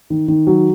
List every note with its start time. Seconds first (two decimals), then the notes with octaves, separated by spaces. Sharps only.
0.10 D#3
0.28 D#3
0.47 F#3